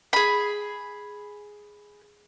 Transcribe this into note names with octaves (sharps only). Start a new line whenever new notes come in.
G#4 B5